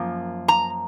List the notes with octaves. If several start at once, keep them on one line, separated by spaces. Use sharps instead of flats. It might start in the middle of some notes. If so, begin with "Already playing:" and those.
Already playing: F#2 F3 A#3
A#5